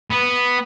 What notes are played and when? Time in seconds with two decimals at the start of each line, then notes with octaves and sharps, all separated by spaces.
0.11 B3